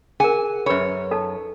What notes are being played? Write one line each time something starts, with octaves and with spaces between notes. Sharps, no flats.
G#4 A#4 F#5 G#5
F#2 B4 C#5 B5
D#4 A4 A5